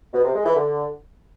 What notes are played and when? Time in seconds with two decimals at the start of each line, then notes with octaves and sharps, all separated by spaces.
0.14 B2
0.24 C3
0.35 G#3
0.45 E3
0.56 D3